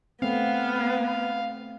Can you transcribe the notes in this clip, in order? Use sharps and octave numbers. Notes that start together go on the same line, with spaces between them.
A3 B3 C4 F5